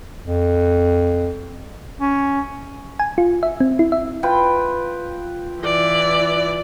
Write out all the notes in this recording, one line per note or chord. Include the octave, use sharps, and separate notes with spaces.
F2
C#4
G#5
F4
E5
C4
E4
E5
F4 B4 G5
E3 D5